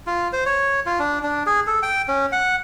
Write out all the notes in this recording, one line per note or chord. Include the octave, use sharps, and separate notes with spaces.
F4
C5
C#5
F4
D4
D4
G#4
A4
G5
C#4
F#5